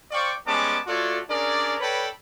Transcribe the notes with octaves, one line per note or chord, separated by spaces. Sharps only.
C5 D5 F5 G5 C#6
G3 G#3 B3 C#4 A5 D6
A3 F4 F#4 A4 C#5 D5
C#4 D4 G#4 A#4 D5
A4 B4 C#5 D5 G5 B5